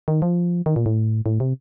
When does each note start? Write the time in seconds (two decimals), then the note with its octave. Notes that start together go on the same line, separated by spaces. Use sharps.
0.08 D#3
0.22 F3
0.66 D#3
0.76 A#2
0.86 A2
1.26 A2
1.40 C3